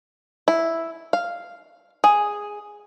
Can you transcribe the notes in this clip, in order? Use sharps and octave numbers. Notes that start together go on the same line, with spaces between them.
E4
F5
G#4